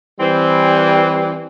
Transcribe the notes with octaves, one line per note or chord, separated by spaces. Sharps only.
E3 G3 C4